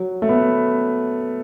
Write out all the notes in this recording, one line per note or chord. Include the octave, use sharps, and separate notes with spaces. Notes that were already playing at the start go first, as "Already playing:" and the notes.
Already playing: F#3
A3
B3